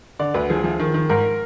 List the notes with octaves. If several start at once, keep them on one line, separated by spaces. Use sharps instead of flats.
D3 D5
D2 B4
F3 G#4
F3
D#3
D#3
G#2 A#4